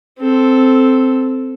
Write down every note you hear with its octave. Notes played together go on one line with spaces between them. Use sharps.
C4 A4